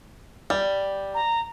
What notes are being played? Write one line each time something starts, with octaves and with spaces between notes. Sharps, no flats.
G3 D5
A#5